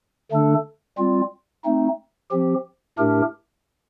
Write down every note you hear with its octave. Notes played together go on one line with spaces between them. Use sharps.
D3 A3 D4 A4
G3 C4 F4
A3 C4 D#4
F3 C4 G4
A2 A3 D4 G4 A#4